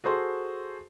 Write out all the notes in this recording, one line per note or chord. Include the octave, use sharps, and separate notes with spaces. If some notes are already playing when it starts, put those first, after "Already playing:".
F#4 G#4 A4 C5 C6